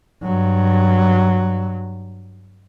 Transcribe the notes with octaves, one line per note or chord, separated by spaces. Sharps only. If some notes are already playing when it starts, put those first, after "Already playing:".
G2 F#3